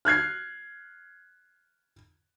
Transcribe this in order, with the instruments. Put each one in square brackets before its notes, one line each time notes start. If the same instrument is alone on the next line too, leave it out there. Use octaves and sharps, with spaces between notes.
[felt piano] F6 F#6 G#6 C7